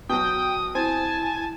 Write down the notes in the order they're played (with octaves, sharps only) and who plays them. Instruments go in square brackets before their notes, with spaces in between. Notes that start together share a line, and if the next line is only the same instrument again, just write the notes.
[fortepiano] B2 F#3 [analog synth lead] G5 [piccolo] D#6
[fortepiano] C4 [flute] E4 [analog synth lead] G#5 [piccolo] A5